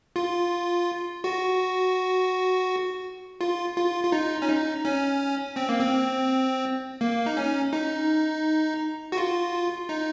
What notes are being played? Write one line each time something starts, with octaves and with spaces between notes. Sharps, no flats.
F4
F#4
F4
F4
F4
D#4
C#4
D#4
C#4
C4
A#3
C4
A#3
D#4
C#4
D#4
F#4
F4
D#4